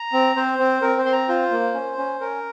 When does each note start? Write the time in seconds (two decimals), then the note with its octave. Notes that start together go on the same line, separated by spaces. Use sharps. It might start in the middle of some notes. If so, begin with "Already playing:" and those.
Already playing: A#5
0.13 C4
0.36 C4 C5
0.59 C4
0.82 C4 A#4
0.98 C5
1.05 C4 C6
1.12 A#5
1.28 F4 C5
1.51 A#3
1.74 C#4
1.98 C#4
2.20 C#4 A#4